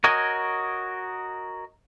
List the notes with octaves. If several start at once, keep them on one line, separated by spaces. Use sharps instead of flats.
F#4 A#4 C#5 D#5 G#5